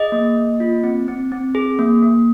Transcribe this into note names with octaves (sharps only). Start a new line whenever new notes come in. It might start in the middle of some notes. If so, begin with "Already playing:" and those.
Already playing: G#4 D#5
A#3
A#3
F4
C4
C4
C4
G#4
A#3
A#3